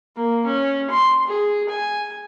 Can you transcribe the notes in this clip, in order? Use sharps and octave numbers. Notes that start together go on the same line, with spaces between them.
A#3
C#4
C6
G#4
G#5